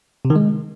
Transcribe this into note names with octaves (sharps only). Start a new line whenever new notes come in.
C3
D#3
G#3